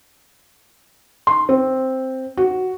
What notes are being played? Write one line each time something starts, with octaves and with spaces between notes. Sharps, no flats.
C6
C4
F#4